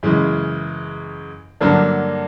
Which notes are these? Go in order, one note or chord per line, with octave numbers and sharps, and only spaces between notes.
F#2 C#3 E3 G#3
G2 D3 F#3 A#3 D4